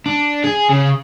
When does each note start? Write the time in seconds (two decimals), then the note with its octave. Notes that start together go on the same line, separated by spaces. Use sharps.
0.06 D4
0.44 G#4
0.70 C#3